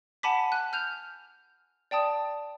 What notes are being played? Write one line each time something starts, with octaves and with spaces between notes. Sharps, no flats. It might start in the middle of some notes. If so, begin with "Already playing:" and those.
F#5 G#5 A5 B5 D6 B6
G#5 F#6
F6 G6 F7
D5 G5 A5 D#6